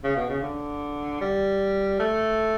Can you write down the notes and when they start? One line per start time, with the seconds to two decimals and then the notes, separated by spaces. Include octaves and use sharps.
0.04 C#3
0.16 B2
0.29 C#3
0.42 D3
1.21 G3
2.00 A3